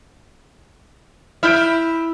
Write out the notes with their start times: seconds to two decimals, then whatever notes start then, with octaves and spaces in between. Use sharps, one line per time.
1.43 E4 F6 G6 D7